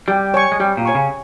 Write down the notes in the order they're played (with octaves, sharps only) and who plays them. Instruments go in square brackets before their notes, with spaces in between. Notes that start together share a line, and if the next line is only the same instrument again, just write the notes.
[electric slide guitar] G3 [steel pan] G4
[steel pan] C#5 G#5 C#6
[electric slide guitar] G#3
[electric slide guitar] G3 [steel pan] G4
[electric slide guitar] A#2
[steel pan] C#5 G#5 C#6
[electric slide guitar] C#3